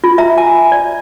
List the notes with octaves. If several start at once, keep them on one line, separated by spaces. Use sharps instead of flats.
F4
E5 A#5
G#5
D5